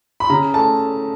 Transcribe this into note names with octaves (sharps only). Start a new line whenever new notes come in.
B5
C#3 A#5
A3 A5